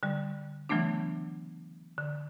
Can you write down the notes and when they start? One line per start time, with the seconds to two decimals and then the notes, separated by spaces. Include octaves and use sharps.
0.03 D3 G3
0.69 C#3 E3 F#3 A3 B3 D4
1.98 D3